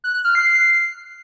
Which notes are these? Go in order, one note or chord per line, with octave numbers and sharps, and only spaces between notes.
F#6
F#6
F6
C7